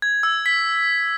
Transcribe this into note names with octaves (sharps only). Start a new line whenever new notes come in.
G#6
E6
B6